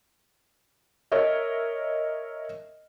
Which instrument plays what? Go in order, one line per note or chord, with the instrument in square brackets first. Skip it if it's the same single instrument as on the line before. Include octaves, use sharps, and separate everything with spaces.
[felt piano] A#4 C#5 D#5 E5